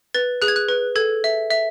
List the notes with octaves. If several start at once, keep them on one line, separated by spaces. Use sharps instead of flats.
B4 A6
G#4 F#6
G#6
F#6
B4
A4 G#6
E5
E5